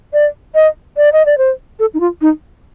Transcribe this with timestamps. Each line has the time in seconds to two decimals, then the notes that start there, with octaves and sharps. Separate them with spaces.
0.13 D5
0.55 D#5
0.97 D5
1.13 D#5
1.26 D5
1.38 C5
1.79 A4
1.94 D#4
2.00 F4
2.21 D#4